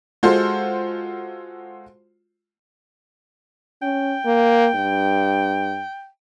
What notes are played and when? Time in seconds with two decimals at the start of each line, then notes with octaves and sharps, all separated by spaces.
0.23 G#3 F4 F#4 A4 C5
3.82 C#4 G5
4.26 A#3
4.74 G2